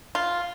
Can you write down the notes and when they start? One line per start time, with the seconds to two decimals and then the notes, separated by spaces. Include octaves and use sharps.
0.15 F4